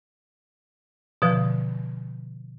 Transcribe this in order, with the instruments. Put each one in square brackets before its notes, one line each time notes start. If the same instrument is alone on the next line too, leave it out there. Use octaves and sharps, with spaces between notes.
[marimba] B2 D3 E3 F3